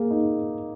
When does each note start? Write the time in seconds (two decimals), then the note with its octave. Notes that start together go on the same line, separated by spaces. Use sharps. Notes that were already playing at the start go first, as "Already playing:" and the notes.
Already playing: A#3 G#4
0.11 D#4